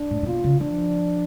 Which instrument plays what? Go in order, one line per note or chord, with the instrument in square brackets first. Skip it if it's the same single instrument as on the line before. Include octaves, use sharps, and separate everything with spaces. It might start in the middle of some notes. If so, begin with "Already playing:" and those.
Already playing: [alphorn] D4
[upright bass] A2
A2
[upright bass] B2 [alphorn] F4
[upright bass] C#3
[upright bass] F3 [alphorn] D4